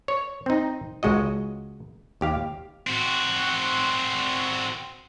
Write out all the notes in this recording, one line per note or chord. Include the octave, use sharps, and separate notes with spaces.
C#5
C4 D#4
C#2 G#3 F#4 D#5
D#2 G4 F5
C4 F#4